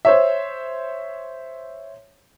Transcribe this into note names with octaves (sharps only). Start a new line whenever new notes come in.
C5 C#5 E5